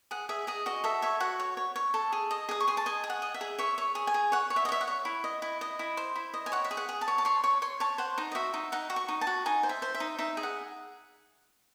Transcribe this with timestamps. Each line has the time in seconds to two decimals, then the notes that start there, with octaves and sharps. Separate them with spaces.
0.11 G#4 F#5
0.29 G#4 E5
0.47 G#4 D#5
0.66 F#4 D#5
0.84 A4 E5
1.02 C#5 E5
1.20 F#4 F#5
1.40 C#5
1.57 C#5
1.76 C#5
1.94 A4
2.13 G#4
2.31 D#5
2.49 G#4 D#6
2.60 C#6
2.68 G#4 C6
2.77 A5
2.86 D#5 G#5
3.04 G#4
3.10 F#5
3.22 D#5
3.34 E5
3.41 G#4
3.59 C#5 E5
3.78 C#5
3.95 G#4
4.07 G#5
4.14 G#4
4.32 C#5 F#5
4.50 C#5
4.56 E5
4.65 D#5
4.69 C#5 E5
4.81 F#5
4.88 C#5
5.05 E4
5.24 D#5
5.42 E4
5.61 D#5
5.79 E4
5.97 C5
6.16 E4
6.34 D#5
6.46 G#5
6.52 C#5 F#5
6.64 E5
6.71 G#4
6.77 F#5
6.89 G#4
7.01 A5
7.08 C#5
7.18 A5
7.25 C#5 C6
7.44 C#5 C#6
7.62 C#5 C6
7.80 C#5 A5
7.98 C5 F#5
8.18 D#4
8.32 D#5
8.35 F#4 E5
8.54 D#4
8.72 D#4 F#5
8.90 F#4
8.96 C#6
9.08 D#4
9.21 A5
9.27 F#4
9.46 D#4 G#5
9.63 C5
9.69 E5
9.82 C5
9.95 E5
10.00 D#4
10.19 D#4 E5
10.37 G#4
10.43 F#5